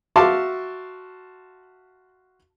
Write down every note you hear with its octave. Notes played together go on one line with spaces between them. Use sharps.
F#4 E5 F5 A5 C6 D6